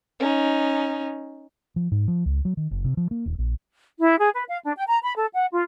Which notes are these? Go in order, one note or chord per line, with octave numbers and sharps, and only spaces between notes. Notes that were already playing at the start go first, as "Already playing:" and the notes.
C#4 D#4
F3
G#2
F3
C#2
F#3
D#3
F#1
C3
F3
A#3
D#1
A#1
E4
G#4
B4
F5
D4
G5
A#5
B5
A4
F#5
F4